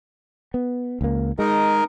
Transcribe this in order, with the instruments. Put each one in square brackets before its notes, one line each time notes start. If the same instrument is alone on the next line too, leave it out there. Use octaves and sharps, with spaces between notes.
[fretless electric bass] B3
C#2 A#3
[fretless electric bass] G#3 [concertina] D#4 A#4